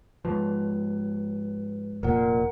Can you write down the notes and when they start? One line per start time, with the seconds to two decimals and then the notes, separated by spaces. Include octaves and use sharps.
0.25 G#2 F3 B4
2.03 F1 A#2 A#4 F#5